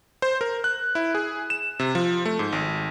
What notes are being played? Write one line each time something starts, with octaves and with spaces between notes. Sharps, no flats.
C5
A#4
F#6
E4
G#4
E7
C3
F3
A3
G#2
G#1